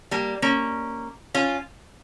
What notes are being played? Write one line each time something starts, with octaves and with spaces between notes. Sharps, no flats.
G3 A#3
A#3 C#4
C#4 F4